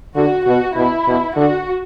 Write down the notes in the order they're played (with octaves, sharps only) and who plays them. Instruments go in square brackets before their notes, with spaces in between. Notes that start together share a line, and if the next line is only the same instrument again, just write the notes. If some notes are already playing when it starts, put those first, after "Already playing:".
[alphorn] D3 [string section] F#4
[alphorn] B2 [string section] F#4
[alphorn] B2 [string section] E4
[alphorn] B2
[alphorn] D3 [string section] F#4